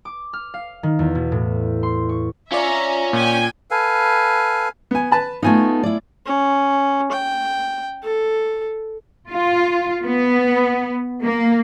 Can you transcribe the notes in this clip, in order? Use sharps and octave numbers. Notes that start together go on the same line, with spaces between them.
D6
F6
F5
D#3
E2
B2
A2
C6
C#6
C#4 F4 C#5 D5 E5 A#5
A#2 G5 G#5
A4 B4 F5 G#5
B3 G#5
B4 A5 B5
A3 B3 D#4 F4 G#5
E4 D5
C#4
G5
A4
F4
B3
A#3